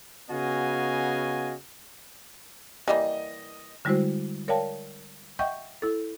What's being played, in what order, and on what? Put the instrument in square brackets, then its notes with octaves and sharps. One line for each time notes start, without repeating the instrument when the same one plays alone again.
[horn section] C#3 B3 F#4 D#5 F5 G#5
[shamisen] E3 G3 A#3 [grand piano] D#5
[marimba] D3 G3 G#3 E4 F#4 C5
A#4 C#5 D5 F5 G5 A5
D#5 E5 F#5 G5 C#6 G6
E4 A4